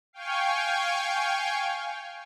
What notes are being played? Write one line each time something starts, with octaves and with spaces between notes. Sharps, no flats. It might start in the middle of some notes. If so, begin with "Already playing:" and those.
F5 G5 G#5 C#6